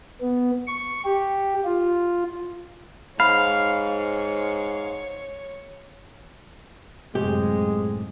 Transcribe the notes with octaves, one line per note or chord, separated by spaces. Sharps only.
B3
C#6
G4
F4
G#2 C#5 F5 B5
F#2 A2 C3 G#3 G4